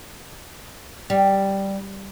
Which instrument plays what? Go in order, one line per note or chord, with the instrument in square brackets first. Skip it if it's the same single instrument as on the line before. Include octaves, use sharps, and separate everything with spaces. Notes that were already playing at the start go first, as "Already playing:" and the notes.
[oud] G3